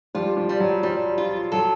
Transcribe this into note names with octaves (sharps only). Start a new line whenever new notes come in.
F3 G3 F4
F3
G3
F#3
F3 G3
F4
F#3 A4